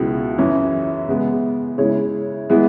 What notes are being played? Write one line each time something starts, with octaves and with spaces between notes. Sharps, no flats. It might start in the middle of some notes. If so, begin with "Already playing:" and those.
Already playing: C#2 B2 F#3 E4
F#2 E3 C#4 E4
C#3 G#3 B3
C#3 G#3 E4 C#5
E3 G#3 B3